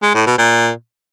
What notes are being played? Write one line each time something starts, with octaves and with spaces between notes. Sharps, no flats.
G#3
A2
B2
A#2